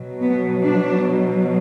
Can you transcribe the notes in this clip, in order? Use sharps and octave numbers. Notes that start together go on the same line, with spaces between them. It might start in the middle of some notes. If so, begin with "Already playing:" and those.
Already playing: B2 F#3
B3
D4